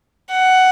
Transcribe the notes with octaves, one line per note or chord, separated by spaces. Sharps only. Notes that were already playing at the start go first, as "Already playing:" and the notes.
F#5